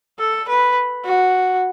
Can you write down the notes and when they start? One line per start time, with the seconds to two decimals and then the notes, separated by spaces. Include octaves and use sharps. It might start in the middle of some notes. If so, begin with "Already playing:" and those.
0.19 A4
0.48 B4
1.05 F#4